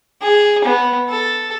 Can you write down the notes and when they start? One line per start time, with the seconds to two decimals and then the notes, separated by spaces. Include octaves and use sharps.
0.22 G#4
0.65 B3
1.09 A4